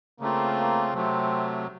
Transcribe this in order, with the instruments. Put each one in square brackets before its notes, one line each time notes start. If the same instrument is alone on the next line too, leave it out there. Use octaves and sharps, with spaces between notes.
[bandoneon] C#3 A3 C4 F4 [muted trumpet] A#3
[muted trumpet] A#3
[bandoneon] C3 F#3 A3 [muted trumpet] C4